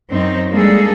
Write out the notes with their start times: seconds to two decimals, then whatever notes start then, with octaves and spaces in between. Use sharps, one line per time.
0.12 F#2 C4 D#4
0.51 G3 G#3 A#3 D4 G#4 A4